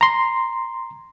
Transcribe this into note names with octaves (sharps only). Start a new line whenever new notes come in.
A#5 C6